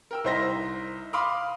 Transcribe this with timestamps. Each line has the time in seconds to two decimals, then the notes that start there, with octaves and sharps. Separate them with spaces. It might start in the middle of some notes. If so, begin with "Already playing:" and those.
0.11 A#4 G5 E6
0.24 C2 D#4 C5 E5 A#6
1.13 F5 B5 C6 D6 D#6 F6